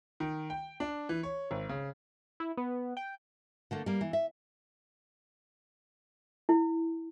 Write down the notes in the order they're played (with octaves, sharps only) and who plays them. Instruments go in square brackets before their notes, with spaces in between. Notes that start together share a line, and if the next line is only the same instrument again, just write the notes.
[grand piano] D#3
G5
D4
E3
C#5
G#1
C#3
[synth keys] E4
B3
G5
[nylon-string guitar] D3 A3 A#3
G3 A#3
E3
E5
[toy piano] E4